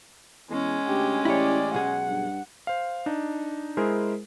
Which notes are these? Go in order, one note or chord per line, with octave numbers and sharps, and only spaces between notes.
E2 G#3 C#4
D2 G4
A1 E4 G4 C#5 D5
B1 G#4 F#5
G2
C5 F5
D4 D#4
G#3 E4 G#4 A#4 C5